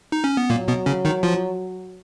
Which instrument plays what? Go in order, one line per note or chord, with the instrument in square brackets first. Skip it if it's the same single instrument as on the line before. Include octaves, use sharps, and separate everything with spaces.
[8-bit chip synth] D#4
C#4
B3
[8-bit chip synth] A#2 A#3 [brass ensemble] F#3
[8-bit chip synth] B2 B3
C#3 C#4
D#3 D#4
F3 F4